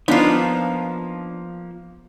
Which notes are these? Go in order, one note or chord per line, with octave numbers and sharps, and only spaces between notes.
F3 A#3 B3 D4 D#4 F4